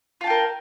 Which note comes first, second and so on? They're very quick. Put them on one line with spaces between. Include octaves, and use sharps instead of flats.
F4 A5 G5 A#4